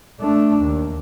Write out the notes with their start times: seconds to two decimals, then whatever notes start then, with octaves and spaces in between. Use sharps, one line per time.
0.21 A3 D4
0.62 D#2